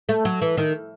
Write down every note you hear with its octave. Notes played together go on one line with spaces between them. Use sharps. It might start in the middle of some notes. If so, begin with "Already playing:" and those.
A3
F#3
E3
D#3